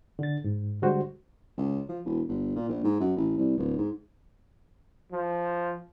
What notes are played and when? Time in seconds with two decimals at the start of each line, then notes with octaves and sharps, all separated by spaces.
0.19 D3 A6
0.44 G#2
0.82 D3 G3 G#3 F#4 C5
1.58 C#2
1.89 F3
2.05 E1
2.29 G1
2.56 A#2
2.69 A#1
2.84 G#2
3.00 F#2
3.17 A1
3.38 C2
3.57 D1
3.78 G#2
5.12 F3